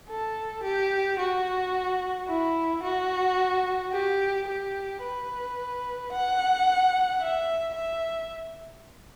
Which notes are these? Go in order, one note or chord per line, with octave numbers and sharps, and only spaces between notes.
A4
G4
F#4
E4
F#4
G4
G4
B4
F#5
E5
E5